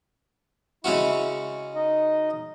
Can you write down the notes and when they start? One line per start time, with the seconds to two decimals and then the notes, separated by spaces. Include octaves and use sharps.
0.84 C#3 G#3 C#4 E4 F#4 E5
1.75 D#4 D#5